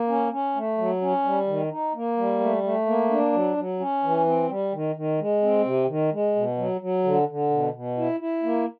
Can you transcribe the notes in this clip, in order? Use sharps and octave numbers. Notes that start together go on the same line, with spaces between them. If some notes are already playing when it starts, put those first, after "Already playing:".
Already playing: A#3
C#4
C#4
A3
F#3
C#4
G3
D#3
D#4
A#3
G3
A3
A3
A#3
D4
F#3
F#3
C#4
E3
C4
G3
D#3
D#3
G#3
C4
C3
D#3
G#3
B2
F#3
F#3
D3
D3
B2
B2
E4
E4
A#3